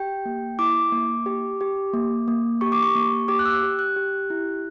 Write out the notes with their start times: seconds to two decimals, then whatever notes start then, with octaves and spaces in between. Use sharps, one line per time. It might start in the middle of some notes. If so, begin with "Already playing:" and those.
Already playing: G4 G5
0.25 A#3
0.59 E4 D6
0.92 A#3
1.26 G4
1.61 G4
1.94 A#3
2.28 A#3
2.61 G4 C#6
2.72 D6
2.83 C#6
2.95 A#3
3.28 G4 D6
3.39 F#6
3.45 E6
3.63 G4
3.79 F#6
3.96 G4
4.30 E4